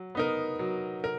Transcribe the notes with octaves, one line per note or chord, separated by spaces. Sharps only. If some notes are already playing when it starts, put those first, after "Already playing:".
Already playing: F#3
B3 D#4 A#4
F#3
A#4